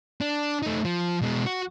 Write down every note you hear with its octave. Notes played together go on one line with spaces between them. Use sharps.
D4
A3 D#4
F3
B2 G#3
F#4